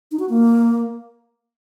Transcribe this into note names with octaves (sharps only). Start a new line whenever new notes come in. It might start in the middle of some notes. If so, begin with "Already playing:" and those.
D#4
F#4
A#3